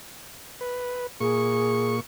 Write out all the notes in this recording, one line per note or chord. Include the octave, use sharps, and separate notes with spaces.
B4
A#2 G#4 C#6